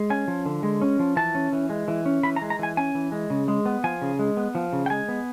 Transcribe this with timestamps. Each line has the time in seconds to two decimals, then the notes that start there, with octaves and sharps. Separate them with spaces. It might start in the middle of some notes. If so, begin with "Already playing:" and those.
Already playing: G#3
0.10 C#4 G#5
0.28 F3
0.46 D3
0.63 G#3
0.81 C#4
0.99 F3
1.16 E3 A5
1.35 C#4
1.52 E3
1.69 G#3
1.88 E3
2.06 C#4
2.23 E3 B5
2.36 A#5
2.42 G#3
2.50 A#5
2.59 E3 G#5
2.77 C#4 G#5
2.95 E3
3.12 G#3
3.30 C#3
3.48 G#3
3.66 B3
3.84 F3 G#5
4.02 C#3
4.19 G#3
4.37 B3
4.55 F3
4.73 C#3
4.86 G5
4.90 G#3 G#5
5.09 B3